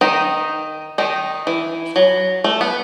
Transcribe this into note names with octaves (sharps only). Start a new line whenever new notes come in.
D#3 D#4
D#3 D#4
E3
F#3
A3
B3